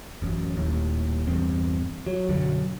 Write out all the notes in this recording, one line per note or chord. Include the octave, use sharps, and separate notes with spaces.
A1 F#2
D#1 D#2 A2
A1 E2 G2 C4
F#3
B1 F#2 D3 F#3